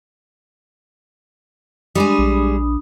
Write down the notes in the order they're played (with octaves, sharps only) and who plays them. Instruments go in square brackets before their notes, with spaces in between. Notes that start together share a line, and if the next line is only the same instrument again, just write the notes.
[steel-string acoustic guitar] G3 G#3 G#4 [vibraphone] D4 B5 D#6
[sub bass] A#1